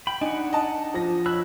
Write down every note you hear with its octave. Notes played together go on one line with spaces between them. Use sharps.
G5 B5
D4 D#4 F#5 G#5
D#5 A5
F3 A#6
C#5 B5 E6 F#6